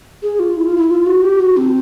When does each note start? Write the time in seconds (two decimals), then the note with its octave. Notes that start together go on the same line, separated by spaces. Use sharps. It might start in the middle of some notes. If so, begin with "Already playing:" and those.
0.23 G#4
0.39 F4
0.57 E4
0.67 F4
0.78 E4
0.91 F4
1.06 F#4
1.23 G4
1.40 F#4
1.57 C4